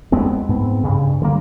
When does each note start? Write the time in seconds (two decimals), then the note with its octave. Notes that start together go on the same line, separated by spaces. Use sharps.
0.12 E2 G#3 B3 C4
0.49 G#2 B3 C4
0.83 G2 C#3
1.22 D3 G3 A#3